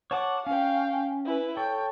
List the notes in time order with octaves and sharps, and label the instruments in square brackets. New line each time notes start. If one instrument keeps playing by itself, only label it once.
[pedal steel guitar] C#5 A5 D6 [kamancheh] F#5
[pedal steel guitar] C#4 [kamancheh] F5 G5
[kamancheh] E4 B4
[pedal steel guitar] A4 C#5 [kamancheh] G5